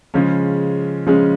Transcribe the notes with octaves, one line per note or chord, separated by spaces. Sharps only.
C#3 F3 G#3 C#4
C#3 F3 G#3 C#4